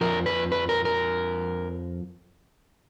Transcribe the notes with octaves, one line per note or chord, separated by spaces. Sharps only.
F2 F3 A#4
B4
B4
A#4
A#4